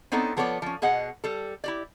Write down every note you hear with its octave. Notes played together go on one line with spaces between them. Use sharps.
B3 C4 D4 D#4 A4 C#5
F3 B3 A4 C#5 D5
F3 C#4
B2 G#4 D#5 F#5
G3 A4
E4 G4 D5